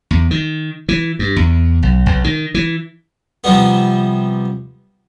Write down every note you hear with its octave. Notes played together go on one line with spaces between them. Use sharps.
E2
D#3
E3
G2
E2
B1
B1
D#3
E3
C3 F3 G3 B3